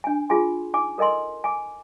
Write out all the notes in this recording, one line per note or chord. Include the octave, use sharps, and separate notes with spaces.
D4 G#5
F4 G#4 G#5 C6
D#4 G#5 D6
A4 A#4 D#5 G#5 C6
G#5 D6